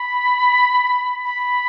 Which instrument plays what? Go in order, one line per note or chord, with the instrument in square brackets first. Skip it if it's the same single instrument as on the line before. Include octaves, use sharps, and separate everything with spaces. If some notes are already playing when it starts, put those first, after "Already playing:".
Already playing: [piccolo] B5
B5